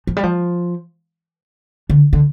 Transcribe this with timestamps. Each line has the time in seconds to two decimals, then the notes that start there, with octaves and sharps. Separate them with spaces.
0.07 F3
0.17 G3
0.23 F3
1.90 D3
2.13 D3